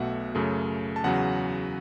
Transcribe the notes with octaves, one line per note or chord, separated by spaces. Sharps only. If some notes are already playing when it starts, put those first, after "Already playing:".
Already playing: B1 B2 A3 E5 F#5
F#2 C#3 A3
A5
E2 C#3 F#3 F#5